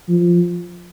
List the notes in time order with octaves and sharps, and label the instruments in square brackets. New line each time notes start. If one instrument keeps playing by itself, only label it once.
[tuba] F3